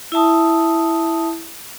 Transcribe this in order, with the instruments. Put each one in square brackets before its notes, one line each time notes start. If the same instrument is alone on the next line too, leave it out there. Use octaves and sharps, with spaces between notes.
[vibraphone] E4 E5 A5 D#6